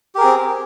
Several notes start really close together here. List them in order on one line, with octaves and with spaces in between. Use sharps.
G4 A#4 G#4 C4